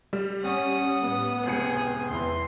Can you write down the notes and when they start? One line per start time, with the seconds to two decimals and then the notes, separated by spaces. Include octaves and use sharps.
0.13 G3
0.43 C#4 F#5 D#6
1.02 A2 B3
1.45 F1 C#2 G#4 C#7
2.08 E2 E3 C6